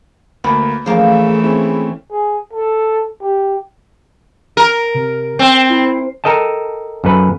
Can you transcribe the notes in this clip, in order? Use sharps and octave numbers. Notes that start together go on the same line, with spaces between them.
D2 A#3 B3 B5
E3 F3 A3 A#3 C#4 G#4
C4 C#4 E4 G#4
G#4
A4
G4
A#4
C3
C4 G5
E4
A4 A#4 D#5 G5 A5
F#2 A4 B4